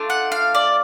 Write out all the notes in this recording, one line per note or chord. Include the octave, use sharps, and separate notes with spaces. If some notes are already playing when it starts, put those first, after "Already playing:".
Already playing: A3 D4 F4
F#5
F5
D5